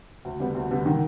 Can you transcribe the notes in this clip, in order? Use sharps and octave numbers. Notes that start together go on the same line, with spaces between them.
D2
D3 G3 B3
D2
D3 G3 B3
D#3